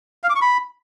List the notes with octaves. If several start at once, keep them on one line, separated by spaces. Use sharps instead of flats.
F5
D6
C#6
B5